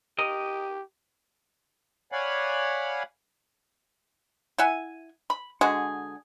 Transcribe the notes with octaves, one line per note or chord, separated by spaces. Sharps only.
G4 A#4 D#5
C#5 D5 F5 F#5 G#5 B5
E4 E5 F#5 G#5
B5
D3 G#3 F#4 G#4